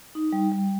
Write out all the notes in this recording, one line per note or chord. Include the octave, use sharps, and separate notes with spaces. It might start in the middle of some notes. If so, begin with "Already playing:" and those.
D#4
G3
G3